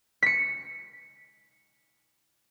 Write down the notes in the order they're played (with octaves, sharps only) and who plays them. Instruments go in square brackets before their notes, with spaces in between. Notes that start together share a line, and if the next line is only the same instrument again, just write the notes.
[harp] B6 C#7